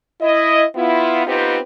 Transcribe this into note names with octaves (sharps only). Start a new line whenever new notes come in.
E4 D#5
B3 E4 F4
B3 C4 D#4 F4 G4 B4